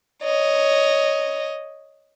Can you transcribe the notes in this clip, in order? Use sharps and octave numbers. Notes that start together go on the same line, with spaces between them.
C#5 D#5